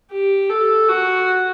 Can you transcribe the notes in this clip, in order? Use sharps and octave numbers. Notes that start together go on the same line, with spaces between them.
G4
A4
F#4